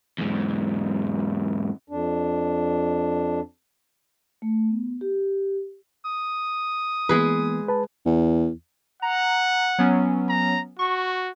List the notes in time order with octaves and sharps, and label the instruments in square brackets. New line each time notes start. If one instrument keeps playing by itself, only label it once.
[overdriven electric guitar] E2 G#2
[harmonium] F2 D4
[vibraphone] A3
B3
G4
[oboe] D#6
[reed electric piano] E3 A#3 B3 [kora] G#3 G#4 B4
[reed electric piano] B4 A5
[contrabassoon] E2
[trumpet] F#5 [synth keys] A#5
[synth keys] F#3 B3 C#4
[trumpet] A#5
[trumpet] F#4 [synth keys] C#6